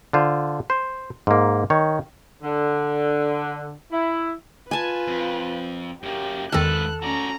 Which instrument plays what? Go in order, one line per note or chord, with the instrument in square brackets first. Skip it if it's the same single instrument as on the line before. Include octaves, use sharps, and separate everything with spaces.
[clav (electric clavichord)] D3 F4 C5
C5
G#2 A#3
D#3 C#5
[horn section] D3
E4
[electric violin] F4 B4 [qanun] G#5 A5
[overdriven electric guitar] F2
[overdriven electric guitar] F#2 A#3 [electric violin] G4
[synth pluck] E2 D#3 E6 [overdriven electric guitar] G#2 B4 [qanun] A4 A5 [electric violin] F#6
[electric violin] C#4 A#5 [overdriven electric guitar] F#4 D5